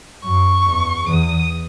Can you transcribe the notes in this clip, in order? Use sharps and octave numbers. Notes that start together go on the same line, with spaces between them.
F#2 C#6
E2
E2 D#6